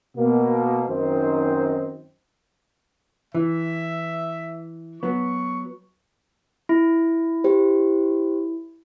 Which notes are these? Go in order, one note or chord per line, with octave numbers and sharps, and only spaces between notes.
B2 A#3
F#2 D#3 C4 D#4 C5
E3 E5
F#3 B3 C#6
E4
G4 C5